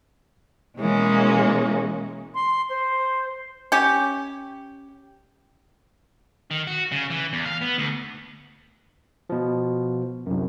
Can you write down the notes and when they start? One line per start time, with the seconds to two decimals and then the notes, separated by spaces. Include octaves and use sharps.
0.78 B2 E3 G#3 A#3 C#4
2.34 C6
2.69 C5
3.72 C#4 G4
6.51 D#3
6.67 F#4
6.92 C#3
7.10 E3
7.33 E2
7.46 F5
7.62 B3
7.78 D2
9.30 B2 F3
10.26 C2 F#2